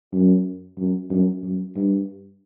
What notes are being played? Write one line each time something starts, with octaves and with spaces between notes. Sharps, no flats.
F#2
F#2
F#2
F#2
G2